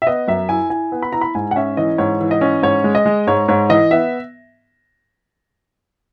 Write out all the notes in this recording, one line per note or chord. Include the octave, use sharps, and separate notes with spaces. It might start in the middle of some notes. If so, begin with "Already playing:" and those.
E5
B3 D#5
F#2 E5
E4 G#5
E4 G#5
B3
B5
E4 A#5
B5
G#2 G#5
F#5
C#4 E5
E3 D#5
G#2 C#5
E3
D#5
C#4
G#2 C#5
G#3
D#5
G#3
G#2 C#5
G#2 C#5
E3 D#5
B3 E5